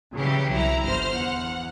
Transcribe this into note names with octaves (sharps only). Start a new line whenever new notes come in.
C#3 E3 F#3 G3 G4
C2 E4 A#5
G1 C5 F6
E2 F#5